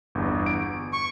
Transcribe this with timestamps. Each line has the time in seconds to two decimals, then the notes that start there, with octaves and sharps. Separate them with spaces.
0.15 G1 E2
0.46 D7
0.93 C#6